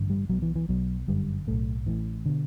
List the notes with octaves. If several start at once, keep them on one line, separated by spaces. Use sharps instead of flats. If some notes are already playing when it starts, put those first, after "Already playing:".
Already playing: A1 G2 D3
G3
B1 B2 F#3
E3
E3
B1 B2 F#3
G1 F#2 D3 G3
B1 A2 A3
A1 A2 E3
B2 D3